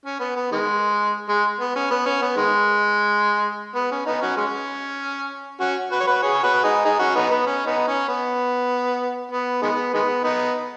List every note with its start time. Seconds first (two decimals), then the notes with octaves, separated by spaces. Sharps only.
0.05 C#4
0.20 B3
0.36 B3
0.52 D#3 G#3
1.29 G#3
1.60 B3
1.76 C#4
1.91 B3
2.06 C#4
2.22 B3
2.37 D#3 G#3
3.75 B3
3.92 C#4
4.06 B3 D#4
4.22 C#4 F#4
4.37 G#3 C#4
5.61 C#4 F#4
5.91 F#4 B4
6.00 C#5
6.07 F#4 B4
6.22 G#4 C#5
6.43 F#4 B4
6.64 D#4 G#4
6.85 D#4 G#4
6.99 C#4 F#4
7.15 B3 D#4
7.31 B3
7.47 C#4
7.67 B3 D#4
7.87 C#4
8.08 B3
9.32 B3
9.62 D#3 G#3 B3
9.94 D#3 G#3 B3
10.24 B3 D#4